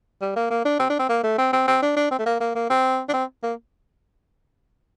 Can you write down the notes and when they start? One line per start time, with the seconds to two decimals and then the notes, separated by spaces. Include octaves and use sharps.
0.21 G3
0.36 A#3
0.50 A#3
0.65 D4
0.79 C4
0.89 D4
0.99 C4
1.09 A#3
1.23 A3
1.38 C4
1.53 C4
1.67 C4
1.82 D4
1.96 D4
2.11 C4
2.19 A3
2.26 A#3
2.40 A#3
2.55 A#3
2.70 C4
3.09 D4
3.13 C4
3.43 A#3